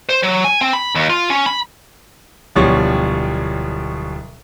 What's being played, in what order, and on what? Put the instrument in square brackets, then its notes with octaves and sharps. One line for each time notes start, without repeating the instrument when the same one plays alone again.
[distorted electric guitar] C5
F#3
G#5
C4
B5
D#2
F4
C#4
B5
[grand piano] D1 B2 F3 G3 C#5